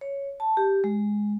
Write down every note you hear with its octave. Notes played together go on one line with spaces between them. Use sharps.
C#5
A5
G4
G#3